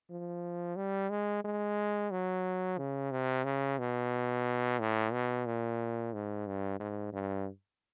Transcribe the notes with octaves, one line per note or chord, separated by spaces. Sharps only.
F3
G3
G#3
G#3
F#3
C#3
C3
C#3
B2
A2
B2
A#2
G#2
G2
G#2
G2